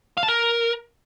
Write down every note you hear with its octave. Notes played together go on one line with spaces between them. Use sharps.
F5
A5
A#4